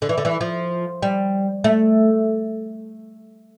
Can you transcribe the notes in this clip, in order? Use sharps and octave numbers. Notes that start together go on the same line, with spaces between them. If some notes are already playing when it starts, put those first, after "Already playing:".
D3
E3
D3
E3
F3
G3
A3